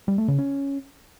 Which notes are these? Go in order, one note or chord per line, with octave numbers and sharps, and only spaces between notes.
G3
A3
C#3
C#4